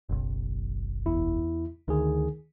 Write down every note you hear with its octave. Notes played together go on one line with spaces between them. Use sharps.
F#1 B1
E2 E4
D2 D#3 G#4